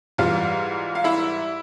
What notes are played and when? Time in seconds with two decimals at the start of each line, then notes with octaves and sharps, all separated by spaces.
0.18 G#2 E3 G3 F4 F5
0.95 F5
1.04 E4 E5